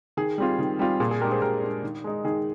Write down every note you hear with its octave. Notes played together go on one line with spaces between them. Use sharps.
D#3 G#4
G3 C4 F4
D#3
G3 C4 F4
A#2 G#4
G#4
G#3 D4 G4 A#4
G#4 C5
A#2 G4 A#4
G#3 D4
D#3
G#3 D#4
D#3 G#4